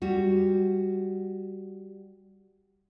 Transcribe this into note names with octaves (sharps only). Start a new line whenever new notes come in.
G3 F#4